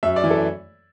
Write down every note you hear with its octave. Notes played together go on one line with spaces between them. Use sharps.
F#2 E5
D5
E3
A4